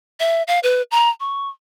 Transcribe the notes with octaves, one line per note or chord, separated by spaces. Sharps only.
E5
F5
B4
A#5
C#6